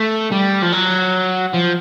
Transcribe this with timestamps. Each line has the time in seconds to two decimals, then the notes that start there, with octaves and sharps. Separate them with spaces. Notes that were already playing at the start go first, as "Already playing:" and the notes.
Already playing: A3
0.31 G3
0.62 F3
0.72 F#3
1.53 F3